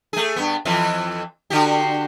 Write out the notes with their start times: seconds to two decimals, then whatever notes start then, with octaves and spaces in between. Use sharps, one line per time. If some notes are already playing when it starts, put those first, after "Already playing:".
0.13 A3 G#4
0.36 G2 B3
0.65 F2 E3 F4
1.50 D3 F#4 G4